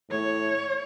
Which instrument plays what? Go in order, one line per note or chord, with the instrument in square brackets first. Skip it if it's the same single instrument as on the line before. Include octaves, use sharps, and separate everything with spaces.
[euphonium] A2 [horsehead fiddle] C#5